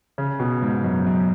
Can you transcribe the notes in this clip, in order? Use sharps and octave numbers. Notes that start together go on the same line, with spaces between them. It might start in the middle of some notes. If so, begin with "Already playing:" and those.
C#3
B2
G#2
F#2
F#2